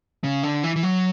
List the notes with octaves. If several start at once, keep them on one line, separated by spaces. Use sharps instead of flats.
C#3
D3
E3
E3
F#3